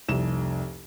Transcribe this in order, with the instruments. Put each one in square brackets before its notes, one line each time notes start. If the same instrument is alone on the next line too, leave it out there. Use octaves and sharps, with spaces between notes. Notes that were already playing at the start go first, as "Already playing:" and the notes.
[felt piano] F1 C2 E7